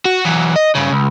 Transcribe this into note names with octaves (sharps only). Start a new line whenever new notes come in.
F#4
E3 F#3
D#5
G2 C#3
C#2